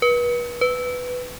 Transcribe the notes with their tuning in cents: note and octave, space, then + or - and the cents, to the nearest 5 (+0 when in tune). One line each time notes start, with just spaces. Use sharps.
B4 -35
B4 +10